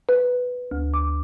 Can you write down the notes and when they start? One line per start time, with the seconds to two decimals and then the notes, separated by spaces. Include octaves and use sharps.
0.09 B4
0.71 D2
0.94 D6